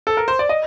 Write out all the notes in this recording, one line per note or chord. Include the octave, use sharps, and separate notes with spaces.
A4
A#4
C5
D5
D#5